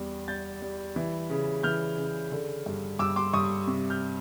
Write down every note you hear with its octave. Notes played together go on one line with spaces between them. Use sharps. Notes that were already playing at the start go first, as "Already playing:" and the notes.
Already playing: E2 G3
G3 G6 A6
G3
E3
C#3
E3 F6 G6
C#3
D3
G2
G2 D6 E6
C6 D6
G2 C#6 D#6
C3
F6 G6